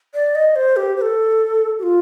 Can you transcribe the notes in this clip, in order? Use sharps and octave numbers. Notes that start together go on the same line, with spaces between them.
D5
D#5
C5
G4
C5
A4
G4
F4